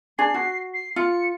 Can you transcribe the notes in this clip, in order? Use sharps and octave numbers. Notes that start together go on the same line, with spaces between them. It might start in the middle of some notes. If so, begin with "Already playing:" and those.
D4 G#4 C7
F#4
C7
F4 C#7